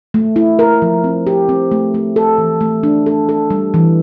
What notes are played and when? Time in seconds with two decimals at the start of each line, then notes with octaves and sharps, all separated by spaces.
0.14 A3
0.36 E4
0.59 A#4
0.82 F3
1.04 C4
1.27 G4
1.49 C4
1.71 A3
1.94 A3
2.16 A4
2.38 E3
2.61 A3
2.83 D4
3.06 A4
3.29 A4
3.51 G3
3.74 E3